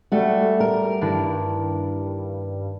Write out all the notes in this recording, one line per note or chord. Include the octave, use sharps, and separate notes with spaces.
G3 A3 F#4
A#4
G2 D#3 D4 E4